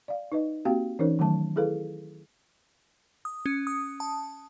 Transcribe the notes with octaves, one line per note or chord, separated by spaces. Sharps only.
D5 F5
D#4 B4 D#5
A#3 C4 F#4 G4 F5 G5
E3 C#4 D#4 A#4 C5 C#5
D#3 F#3 A3 A5
E4 G#4 A4 B4 F5
D#6
C#4
D#6
A5